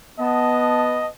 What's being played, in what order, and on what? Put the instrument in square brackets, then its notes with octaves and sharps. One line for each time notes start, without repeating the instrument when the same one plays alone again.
[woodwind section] B3 A5 [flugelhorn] D#5